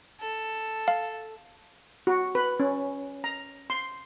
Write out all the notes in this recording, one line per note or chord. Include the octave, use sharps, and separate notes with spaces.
A4
F5
F#4
B4
C#4
A#5
C6